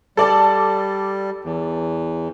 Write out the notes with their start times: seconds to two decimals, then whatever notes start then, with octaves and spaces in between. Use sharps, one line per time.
0.17 G3 A4 D5 A5
1.44 E2